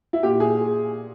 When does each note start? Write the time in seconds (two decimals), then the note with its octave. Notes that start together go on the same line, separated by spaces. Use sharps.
0.13 E4
0.23 A#2 G4
0.40 G#4